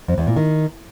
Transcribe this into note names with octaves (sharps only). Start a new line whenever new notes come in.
F2
E2
A#2
D#3